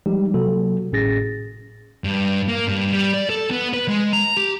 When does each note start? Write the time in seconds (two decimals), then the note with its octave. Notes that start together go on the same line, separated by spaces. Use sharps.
0.06 F3 G3 G#3 D#4 G4
0.34 C3 F#3 A#3 F#4 A4
0.92 G#1 A2 C#4 G#4 A6 A#6
2.04 G2
2.48 A#3
2.68 G2
2.92 G3
3.13 D5
3.30 A4
3.51 B3
3.74 B4
3.88 G#3
4.13 A#5
4.37 G4